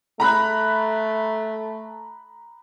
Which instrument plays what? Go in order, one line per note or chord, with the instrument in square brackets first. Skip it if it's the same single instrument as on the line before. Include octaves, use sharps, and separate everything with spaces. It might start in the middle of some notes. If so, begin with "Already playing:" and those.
[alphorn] A3 [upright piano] A#5 B5 F#6